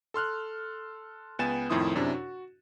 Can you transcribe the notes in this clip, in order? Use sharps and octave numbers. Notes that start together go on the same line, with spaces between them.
A4 C6 F6 F#6
C#2 B3 G5 G#5 A6 E7
F2 A2 D#3 E4 C6 D#6
F#2 C3 D4 E4
F#4